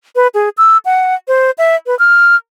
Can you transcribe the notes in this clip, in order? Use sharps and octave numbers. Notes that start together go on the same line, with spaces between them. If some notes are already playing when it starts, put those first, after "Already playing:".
B4
G#4
E6
F#5
C5
E5
B4
F6